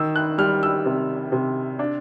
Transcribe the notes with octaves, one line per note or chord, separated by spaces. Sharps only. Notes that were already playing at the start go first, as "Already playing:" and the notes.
Already playing: D#3 E6
F#6
G3 F6
E6
C3
C3
D4